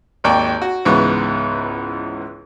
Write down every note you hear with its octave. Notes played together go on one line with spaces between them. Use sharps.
G#1 D#2 D5 G5 C#6
F#4
C#2 G#2 E3 B3 C#6